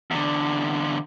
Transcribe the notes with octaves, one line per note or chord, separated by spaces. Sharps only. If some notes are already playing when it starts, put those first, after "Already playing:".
E2 D3